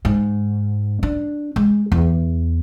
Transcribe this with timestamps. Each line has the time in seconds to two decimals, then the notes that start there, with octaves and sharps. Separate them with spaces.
0.05 G#2
1.03 D4
1.56 G#3
1.92 E2